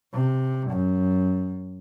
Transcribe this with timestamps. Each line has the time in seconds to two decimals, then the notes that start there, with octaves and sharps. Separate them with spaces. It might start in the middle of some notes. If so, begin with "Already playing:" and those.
0.14 C3
0.71 F#2